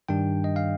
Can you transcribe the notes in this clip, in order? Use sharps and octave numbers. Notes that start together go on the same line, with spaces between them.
G2 D#3 G3 D4 G5
D#5
F5